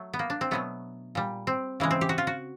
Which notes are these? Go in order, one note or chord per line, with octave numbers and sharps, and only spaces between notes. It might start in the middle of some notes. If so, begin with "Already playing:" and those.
Already playing: F#3 A3
B3
A#3
D4
C4
B2 F#3 A3 B3
A#2 G3
C4
C#3 E3 G#3
C4
G4
F#4
F4
F#4